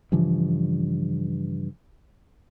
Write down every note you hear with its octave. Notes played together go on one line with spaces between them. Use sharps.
G2 C#3 E3 F3